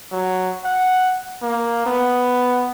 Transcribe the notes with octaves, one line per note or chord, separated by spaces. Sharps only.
F#3
F#5
A#3
B3